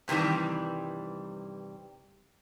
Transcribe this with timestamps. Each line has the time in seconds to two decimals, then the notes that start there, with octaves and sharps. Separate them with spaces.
0.08 G2 C3 D#3 E3 G3